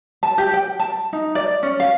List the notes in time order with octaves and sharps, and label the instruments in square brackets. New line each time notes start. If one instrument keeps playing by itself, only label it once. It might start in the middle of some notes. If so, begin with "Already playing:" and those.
[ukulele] A5
G4
G5
A5
D#4
D5
C#4
F5